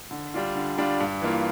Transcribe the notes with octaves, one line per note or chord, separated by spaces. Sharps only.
D3
G3 D4 F4
D3
G3 D4 F4
G2
E3 A#3 F4